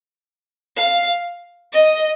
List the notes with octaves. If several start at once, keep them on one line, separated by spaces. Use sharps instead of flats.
F5
D#5